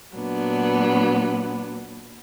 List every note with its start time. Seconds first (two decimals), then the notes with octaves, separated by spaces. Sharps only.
0.16 A#2 F#3 B3 D4